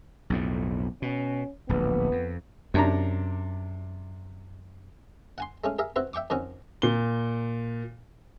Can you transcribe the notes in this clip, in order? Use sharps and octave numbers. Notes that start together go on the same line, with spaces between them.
B1 F2 A2
B2 C#4
D1 A#1 B3
F2
F#2 C3 D4 A#5
F#5 G#5 C6
G#3 A3 C#4
G#4 A#4 E5
C4 E4 F#4 B4
E5 G5 C#6 D6
F2 D#3 C4 C#4 F#4 G#5
A#2 G7